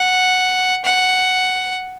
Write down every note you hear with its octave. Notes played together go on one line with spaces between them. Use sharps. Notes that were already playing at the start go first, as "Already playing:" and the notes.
Already playing: F#5
F#5